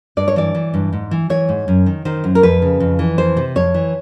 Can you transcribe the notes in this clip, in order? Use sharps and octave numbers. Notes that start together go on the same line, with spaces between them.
G2 D5
C#5
E3 D5
E3
G2
G#2
E3
E3 C#5
G#2
F#2
D#3
D#3 C5
F#2
A#4
F2 B4
C#3
F2
E3
F2 C5
C3
F2 C#5
E3